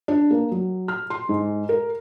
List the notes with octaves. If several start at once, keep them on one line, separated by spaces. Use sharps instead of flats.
D4
A#3
F#3
F6
C6
G#2
A#4